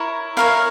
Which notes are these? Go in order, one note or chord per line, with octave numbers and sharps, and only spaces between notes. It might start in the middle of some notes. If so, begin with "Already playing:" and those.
Already playing: E4 A#4 C#5
E4 A#4 C#5 F5